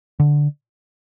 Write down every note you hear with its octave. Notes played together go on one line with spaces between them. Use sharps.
D3